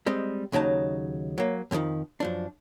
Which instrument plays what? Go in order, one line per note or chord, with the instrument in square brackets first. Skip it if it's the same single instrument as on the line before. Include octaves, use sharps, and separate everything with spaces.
[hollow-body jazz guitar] G3 G#3 C4 D#5
D#2 C#3 F#3 D#4 A5
F#3 A#3
F2 A#2 D3 D#3 F3
F#2 F3 D4